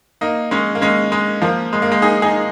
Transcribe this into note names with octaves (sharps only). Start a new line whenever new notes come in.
A#3 D#4
G#3 C#4
A#3
G#3 C#4
G#3
F3 A#3
G#3
A#3
G#3
D#4 G#4
D#4 G#4